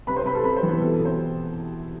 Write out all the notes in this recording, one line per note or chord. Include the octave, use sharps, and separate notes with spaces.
C3 B4 B5
C5 C6
C3 B4 B5
A4 A5
C3 B4 B5
C4 C5
E3
B3 B4
B2 A4
A4
B2
C4 C5